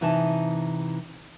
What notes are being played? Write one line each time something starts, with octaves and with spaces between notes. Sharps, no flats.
C3 E3 D#4 G#5 A5